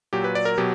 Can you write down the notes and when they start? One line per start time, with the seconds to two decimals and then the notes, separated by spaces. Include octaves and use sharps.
0.13 A#2 F#3 G4
0.24 B4
0.35 D5
0.45 A#4
0.58 B2 F#3 G4